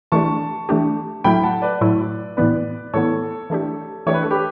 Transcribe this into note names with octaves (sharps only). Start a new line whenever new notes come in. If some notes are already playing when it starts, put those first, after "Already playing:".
E3 A3 D4 G4 A5 C#6
E3 A3 D4 G4
A2 F#3 A3 E4 G5 B5
F#5 A5
B4 D5
A2 F#3 A3 E4
A2 E3 B3 B4 D5
A2 E3 B3 A4 C#5
E3 A3 D4 G4
E3 A3 D4 G4 C#5
B4
A4
G4 B4